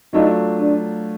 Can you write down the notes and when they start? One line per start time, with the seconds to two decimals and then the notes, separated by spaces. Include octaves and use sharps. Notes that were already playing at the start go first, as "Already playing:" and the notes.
0.13 F#3 A3 D4 D#4 F4
0.61 D4